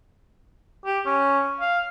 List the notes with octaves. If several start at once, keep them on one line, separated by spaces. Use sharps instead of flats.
G4
C#4
F5